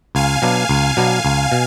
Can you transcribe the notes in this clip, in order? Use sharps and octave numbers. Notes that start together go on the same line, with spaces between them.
C#2 F5 G#5
B2 F#3 B3 D4
C#2
B2 F#3 B3 D4
C#2
B2